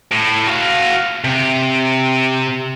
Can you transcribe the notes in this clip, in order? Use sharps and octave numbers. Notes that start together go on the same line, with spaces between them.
A2
F#4 F5
C3